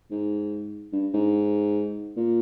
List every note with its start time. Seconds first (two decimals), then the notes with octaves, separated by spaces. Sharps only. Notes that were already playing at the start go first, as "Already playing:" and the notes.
0.11 G#2
0.93 G2
1.14 G#2
2.17 A#2